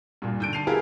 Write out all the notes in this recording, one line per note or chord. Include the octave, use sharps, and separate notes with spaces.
G2 A#2
D3 G6 D7
A5 C7 D#7 F7
B3 E4 F4 G4 G#4 A#4